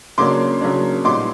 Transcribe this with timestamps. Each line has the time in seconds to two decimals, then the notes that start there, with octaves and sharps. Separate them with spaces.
0.18 C#3 F#3 A#3 D4 C6 D6
0.61 C#3 F#3 A#3 D4
1.05 A#2 G3 B3 D#4 C6 D6